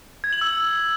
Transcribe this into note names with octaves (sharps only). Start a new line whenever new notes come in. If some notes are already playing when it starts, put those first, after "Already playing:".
G#6
F#7
E6